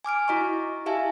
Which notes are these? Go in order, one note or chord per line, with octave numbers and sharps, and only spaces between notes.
G#5 D6 F6 D7
E4 F#4 D#5 A#5 C#6
E4 G4 E5 F5 G#5 A5